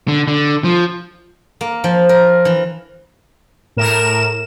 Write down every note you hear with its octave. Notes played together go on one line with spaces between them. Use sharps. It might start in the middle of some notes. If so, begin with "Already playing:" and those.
D3
D3
F3
A#3
F3
A#4
E3
A2 A#4 E7